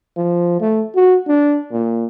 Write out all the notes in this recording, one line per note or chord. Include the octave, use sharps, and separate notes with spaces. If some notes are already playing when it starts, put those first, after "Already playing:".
F3
A3
F#4
D4
A#2